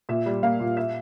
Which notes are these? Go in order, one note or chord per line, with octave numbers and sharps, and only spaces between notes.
A#2 E5
G3
A#3 F5
A#2
E5